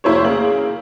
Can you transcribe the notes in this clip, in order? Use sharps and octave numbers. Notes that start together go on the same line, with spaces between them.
F1 A#3 E4 C5 C#5
C#3 A#3 F#7